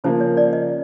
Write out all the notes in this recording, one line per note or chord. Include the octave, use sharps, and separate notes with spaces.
C#3 F3 A#3 C5
C#5
D5
D#5